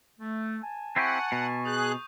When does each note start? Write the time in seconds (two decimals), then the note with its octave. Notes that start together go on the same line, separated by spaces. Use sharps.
0.19 A3
0.62 G#5 A5
0.96 C4 E4 G4 F#5 C#6 D#7
1.32 B2
1.65 G#4 D#6 F#6 G6